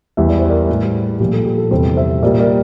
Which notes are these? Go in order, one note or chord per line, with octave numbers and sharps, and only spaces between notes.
E2 E3 G3 E5
D5
C5
A#4 D5
A2 G3
A#2 F3 G4
A4
G4
A4
E2 C3 G3 A4 C5
C5 E5
A#2 G3 A#4 D5
A#4 D5